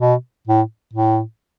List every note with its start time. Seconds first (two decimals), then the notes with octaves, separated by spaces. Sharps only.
0.01 B2
0.48 A2
0.94 A2